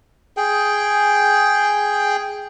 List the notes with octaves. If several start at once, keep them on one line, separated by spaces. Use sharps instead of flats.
G#4 G5